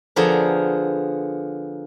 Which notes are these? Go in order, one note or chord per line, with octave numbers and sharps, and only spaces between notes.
D3 F3 B3 G#4 A#4